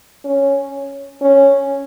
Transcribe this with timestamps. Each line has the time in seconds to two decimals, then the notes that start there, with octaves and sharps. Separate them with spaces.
0.25 C#4
1.21 C#4